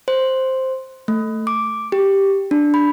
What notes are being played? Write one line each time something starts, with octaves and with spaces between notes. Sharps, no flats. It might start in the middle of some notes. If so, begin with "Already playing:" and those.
C5
A3
D6
G4
D4
B5